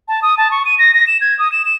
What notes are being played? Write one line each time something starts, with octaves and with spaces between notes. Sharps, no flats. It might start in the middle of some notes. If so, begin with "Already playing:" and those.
A5
D#6
A5
C#6
D#7
A#6
A#6
E7
G#6
D#6
E7
E7